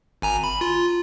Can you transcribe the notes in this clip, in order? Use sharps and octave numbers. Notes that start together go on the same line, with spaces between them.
G#1 G#5 A#5
B5
F4